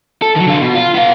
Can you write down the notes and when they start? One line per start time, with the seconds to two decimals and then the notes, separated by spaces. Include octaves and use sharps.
0.22 A4
0.36 D#3 F#3
0.47 D3 F4
0.61 B2
0.75 F4
0.94 B3 F5